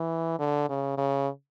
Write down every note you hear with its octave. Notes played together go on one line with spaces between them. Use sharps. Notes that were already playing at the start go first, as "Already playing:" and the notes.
Already playing: E3
D3
C#3
C#3